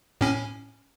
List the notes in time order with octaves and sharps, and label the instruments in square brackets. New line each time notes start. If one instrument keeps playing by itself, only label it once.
[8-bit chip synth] A2 C#4